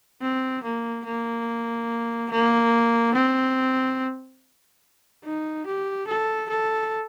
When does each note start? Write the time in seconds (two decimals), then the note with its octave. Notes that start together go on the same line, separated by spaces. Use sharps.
0.21 C4
0.64 A#3
1.05 A#3
2.31 A#3
3.15 C4
5.24 D#4
5.66 G4
6.08 A4
6.50 A4